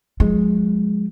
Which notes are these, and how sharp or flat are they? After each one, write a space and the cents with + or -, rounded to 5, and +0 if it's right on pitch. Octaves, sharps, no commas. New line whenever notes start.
F3 +40 G#3 +0